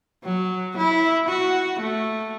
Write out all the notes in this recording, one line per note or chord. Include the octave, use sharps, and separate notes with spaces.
F#3
E4
F#4
A3